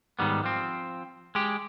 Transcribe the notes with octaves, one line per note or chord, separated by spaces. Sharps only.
G#2 D#3 G3 B3
F3 C4
G#3 G4